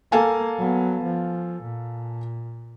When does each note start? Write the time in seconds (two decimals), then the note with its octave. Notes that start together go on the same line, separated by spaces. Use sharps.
0.12 A#3 A4 F5 G#5
0.59 F#3 B3
1.04 F3
1.63 A#2